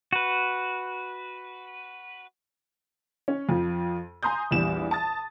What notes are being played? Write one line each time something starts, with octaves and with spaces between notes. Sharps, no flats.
F#4 B4
C#4
F2 F3
G#5 A#5 C6 D#6 G6
A#1 E2 G3 E7
A5 D#6 A6